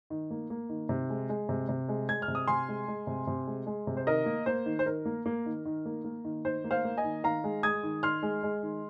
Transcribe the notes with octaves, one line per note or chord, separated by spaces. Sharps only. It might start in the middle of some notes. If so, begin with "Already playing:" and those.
D#3
A#3
A#3
D#3
C3
G#3
G#3
C3
C3
G#3
G#3 G#6
F6
C3
D#6
C3 G#5 C6
G#3
G#3
C3
C3
G#3
G#3
C3
C5
D#3 A#4 D#5
A#3
A#3 C5
D#3
C5
D#3 A#4
A#3
A#3
D#3
D#3
A#3
A#3
D#3
D#3 C5
A#3
C5 F5
A#3
D#5 G#5
D#3
D#3 F5 A#5
G#3
G#3 D#6 G#6
D#3
D#3 C6 F6
G#3
G#3
D#3